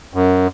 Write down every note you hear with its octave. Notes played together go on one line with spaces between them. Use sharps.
F#2